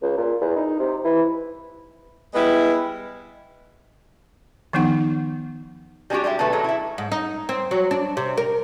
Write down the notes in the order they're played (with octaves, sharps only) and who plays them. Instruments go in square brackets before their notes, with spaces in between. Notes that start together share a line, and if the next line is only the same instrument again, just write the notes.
[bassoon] C#2
A#2
E2
D#4
C3
E3
[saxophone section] G3 G#3 B3 E4
[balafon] D#3 F3 B3 D#4 F#5
[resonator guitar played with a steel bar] G3 G#3 A#3 D4 F#4 G4
G3 G#3 G4 E5
B2 D3 F#3 A3 B4 E5
A#2 F#3 G#3 F#4 A4
E4 E5
[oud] G#2
D#4
C4
F#3
D4
C3
A#4